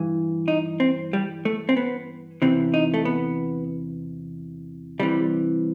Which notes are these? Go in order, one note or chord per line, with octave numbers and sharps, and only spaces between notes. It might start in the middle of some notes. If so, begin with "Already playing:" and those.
Already playing: G2 E3
D#4
C4
G3
A3
C4
B3
E2 C3 E3 C4
D#4
A3
B3
C2 C3 E3 G3